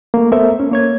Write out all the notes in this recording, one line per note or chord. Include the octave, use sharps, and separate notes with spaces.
A3 A#3
A3 B3 A4 A#4 C5 E5
C#4
A#3 C#5 G#6